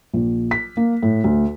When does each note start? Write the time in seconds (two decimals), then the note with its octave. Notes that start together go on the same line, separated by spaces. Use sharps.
0.14 A#1
0.51 B6
0.77 A#3
1.02 A2
1.24 D2